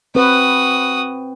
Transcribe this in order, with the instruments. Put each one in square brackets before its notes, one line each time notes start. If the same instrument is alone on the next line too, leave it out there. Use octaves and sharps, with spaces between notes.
[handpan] C4 B4 [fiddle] F#4 D#6